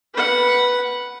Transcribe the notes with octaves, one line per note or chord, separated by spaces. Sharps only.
B4 F#5